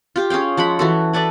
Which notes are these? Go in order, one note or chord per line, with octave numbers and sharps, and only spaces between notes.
F4 G4
C#4 G#4 F5 G5
F3 G#3 F#5 B5
E3 F#4 A4
E4 A4 B4 D5